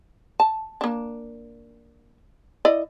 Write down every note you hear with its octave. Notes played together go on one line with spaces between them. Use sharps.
A5
A#3 D4
E4 D5 D#5